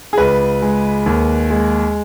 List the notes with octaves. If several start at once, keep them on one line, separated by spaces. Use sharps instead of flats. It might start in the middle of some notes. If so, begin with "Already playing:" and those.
G#4
C#2 B4
G#3
D#2
G#3